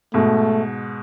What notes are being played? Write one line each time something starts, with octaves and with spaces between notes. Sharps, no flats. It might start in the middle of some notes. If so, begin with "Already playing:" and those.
G#2 B2 A3